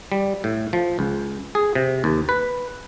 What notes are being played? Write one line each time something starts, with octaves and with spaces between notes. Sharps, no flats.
G3
A2
F3
C#2
G#4
C3
D#2
B4